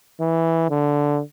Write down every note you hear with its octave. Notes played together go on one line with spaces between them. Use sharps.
E3
D3